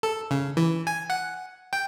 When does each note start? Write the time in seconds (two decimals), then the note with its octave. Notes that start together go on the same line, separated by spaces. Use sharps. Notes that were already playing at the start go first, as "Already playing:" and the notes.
0.03 A4
0.31 C#3
0.57 E3
0.87 G#5
1.10 F#5
1.73 G5